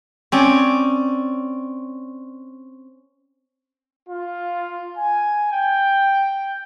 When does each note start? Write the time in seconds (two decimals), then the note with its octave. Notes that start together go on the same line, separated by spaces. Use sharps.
0.32 C4 C#4 D5
4.07 F4
4.97 G#5
5.51 G5